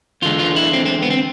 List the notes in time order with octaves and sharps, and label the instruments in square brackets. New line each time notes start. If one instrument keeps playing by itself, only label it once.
[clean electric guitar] E2 D3 G#3 F4
F4
E4
C4
C4
B3
C4